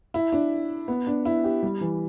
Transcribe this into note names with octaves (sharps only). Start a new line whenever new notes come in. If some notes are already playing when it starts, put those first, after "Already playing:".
E4
D4
B3
D4
E4
G4
G3
E3